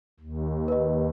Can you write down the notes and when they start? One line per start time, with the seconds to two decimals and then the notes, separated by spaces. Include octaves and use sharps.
0.20 D#2
0.68 B4 D#5